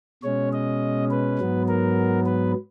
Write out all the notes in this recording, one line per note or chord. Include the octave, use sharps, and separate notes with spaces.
B2 G#3 C#4 C#5
D#5
B4
G#2 F#3 B3
A#4
B4